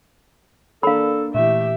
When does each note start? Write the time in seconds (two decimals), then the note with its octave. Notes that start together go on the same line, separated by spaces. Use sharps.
0.83 A#3 D4 A4 A#4 F5 B5
1.34 A#2 E3 A3 G4 E5